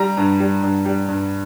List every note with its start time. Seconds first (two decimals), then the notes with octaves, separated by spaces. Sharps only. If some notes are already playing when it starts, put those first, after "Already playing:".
Already playing: G3 A#5
0.17 G2
0.40 G3
0.63 G2
0.85 G3
1.08 G2